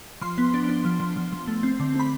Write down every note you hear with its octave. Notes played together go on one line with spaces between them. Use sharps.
F3 C6
B3
D4
D4
F3
F3
F3
F3
A3
C4
D3
C4 B5